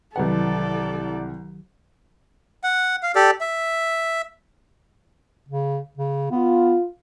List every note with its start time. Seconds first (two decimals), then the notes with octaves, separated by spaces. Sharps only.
0.16 C2 D#3 E3 F#3 A4 B4 D5 F#5
2.64 F#5
3.03 F5
3.15 G4 A4 D5
3.41 E5
5.49 C#3
5.98 C#3
6.31 B3 F4